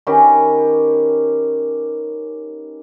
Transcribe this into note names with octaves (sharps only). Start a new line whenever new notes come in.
D#3 C#4 G4 B4